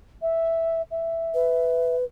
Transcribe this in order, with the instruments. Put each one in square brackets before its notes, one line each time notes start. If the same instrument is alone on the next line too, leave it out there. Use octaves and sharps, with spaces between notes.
[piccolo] E5
E5
[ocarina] B4